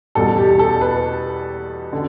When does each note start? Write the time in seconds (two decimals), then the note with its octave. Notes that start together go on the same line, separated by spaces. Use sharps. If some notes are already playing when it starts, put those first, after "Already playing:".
0.15 E2 B2 G3 A4
0.38 G4
0.59 A4
0.81 B4
1.93 D3